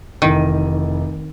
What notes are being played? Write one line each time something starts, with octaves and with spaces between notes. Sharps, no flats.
F1 D#3 E3 D#7